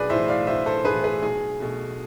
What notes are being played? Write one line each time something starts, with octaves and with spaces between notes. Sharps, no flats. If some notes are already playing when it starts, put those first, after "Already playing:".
Already playing: B1 G#4 B4 D5
A2 E3 C5 E5
D5 F5
B1 C5 E5
A4 C5
A2 E3 G#4 B4
G#4 B4
B1 G#4
B2 A3